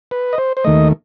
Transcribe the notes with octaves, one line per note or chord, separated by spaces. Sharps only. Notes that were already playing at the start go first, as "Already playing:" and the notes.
B4
D#5
C5
C5
D#2 D#3 A3 D#5